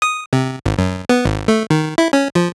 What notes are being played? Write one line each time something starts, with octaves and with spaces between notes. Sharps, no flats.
D#6
C3
G#1
F#2
B3
G#1
A3
D#3
E4
C#4
F3